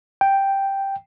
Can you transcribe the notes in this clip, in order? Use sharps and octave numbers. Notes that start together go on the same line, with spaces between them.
G5